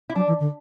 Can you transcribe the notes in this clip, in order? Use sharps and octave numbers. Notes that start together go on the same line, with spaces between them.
E4
F#3 D4
E3
D3